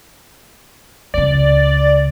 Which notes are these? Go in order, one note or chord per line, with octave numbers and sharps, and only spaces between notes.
C#2 C#3 D5